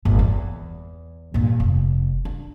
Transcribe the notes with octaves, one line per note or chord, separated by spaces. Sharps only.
G1 A#2
E2
G2 A#2
F1
D4